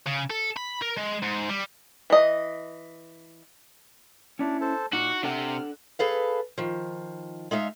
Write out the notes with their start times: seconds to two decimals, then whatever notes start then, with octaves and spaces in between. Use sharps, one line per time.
0.06 C#3
0.30 A4
0.56 B5
0.82 A#4
0.97 G#3
1.22 G#2
1.49 G3
2.10 E3 D#5
4.39 C#4 D4 E4 D5
4.61 A4 C5 A5
4.93 A#2 D#4 F#4 D6 F6
5.23 C3 D4 A4 F#5 F6
5.99 G#4 A4 B4 F5
6.58 D#3 F3
7.51 G#3 D#4 E5 F5